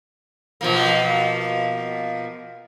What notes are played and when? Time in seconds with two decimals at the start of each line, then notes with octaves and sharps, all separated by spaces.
0.61 B2 F3 A#3